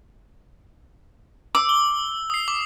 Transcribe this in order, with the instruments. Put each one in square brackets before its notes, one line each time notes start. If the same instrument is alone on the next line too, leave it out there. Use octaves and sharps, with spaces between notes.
[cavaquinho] D6 [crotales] E6
[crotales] G7
D#6 C7
D6